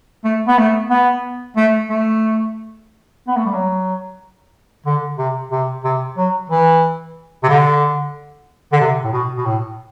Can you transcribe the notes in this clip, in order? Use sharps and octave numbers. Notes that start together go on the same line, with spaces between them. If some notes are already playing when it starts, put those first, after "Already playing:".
A3
B3
A3
B3
A3
A3
B3
A3
G3
F#3
D3
C3
C3
C3
F#3
E3
C3
D3
D3
C3
A2
B2
B2
A2